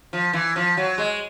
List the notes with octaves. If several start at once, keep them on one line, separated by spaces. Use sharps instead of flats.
F3
E3
F3
F#3
G#3